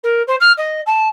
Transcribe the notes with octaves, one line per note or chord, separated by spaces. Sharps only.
A#4
C5
F6
D#5
A5